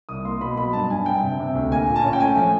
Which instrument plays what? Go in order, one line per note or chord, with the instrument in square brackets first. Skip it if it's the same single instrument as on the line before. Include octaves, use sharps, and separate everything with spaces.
[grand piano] C2 D#6
A#3 C6
B2 B5
F#3 B5
G2 A5
G2 G#5
G2 G5
C3
C3
D2
A#3 G#5
A#2
A5
C#4
G5
A3 G#5
F3